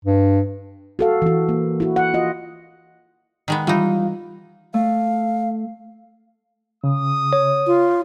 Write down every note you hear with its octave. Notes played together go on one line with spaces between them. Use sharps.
G2
F#4 A4 F5
E3 F#4
A#3
E4 F#4
F#5
F4 D#5
D#3 G#3 B3
E3 G3 D#4 F4 F5
A3 F5
C#3 D#6
C#5
F4